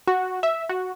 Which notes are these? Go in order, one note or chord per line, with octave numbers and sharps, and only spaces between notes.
F#4
E5
F#4